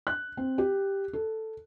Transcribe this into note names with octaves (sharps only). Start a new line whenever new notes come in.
F#6
C4
G4
A4